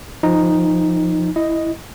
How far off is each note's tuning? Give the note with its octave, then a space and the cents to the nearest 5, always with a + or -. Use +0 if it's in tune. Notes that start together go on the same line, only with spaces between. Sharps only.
F3 +0 D#4 +0
E4 +0 D#5 +0